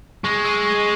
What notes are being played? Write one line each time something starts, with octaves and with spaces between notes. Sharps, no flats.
G#3 C#6
E6 G#6 C7 D#7
C#6